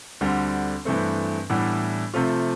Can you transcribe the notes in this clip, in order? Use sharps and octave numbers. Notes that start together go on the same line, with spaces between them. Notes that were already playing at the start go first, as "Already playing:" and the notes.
D2 D3 G3 C4
G2 E3 A3 C4
A2 E3 G3 B3 D4
C3 F3 A3 C4 F4